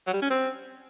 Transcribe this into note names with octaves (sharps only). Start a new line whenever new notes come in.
F#3
G3
C#4
C4